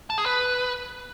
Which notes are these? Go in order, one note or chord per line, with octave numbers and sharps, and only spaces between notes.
A5
G#4
B4